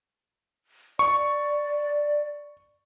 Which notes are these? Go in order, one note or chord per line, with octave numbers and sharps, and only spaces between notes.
D5 C#6